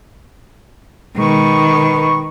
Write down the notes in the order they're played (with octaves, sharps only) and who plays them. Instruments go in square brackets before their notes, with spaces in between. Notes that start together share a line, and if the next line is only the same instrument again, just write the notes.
[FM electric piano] B2 G#3 [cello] D#3 [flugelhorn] B4 [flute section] C#6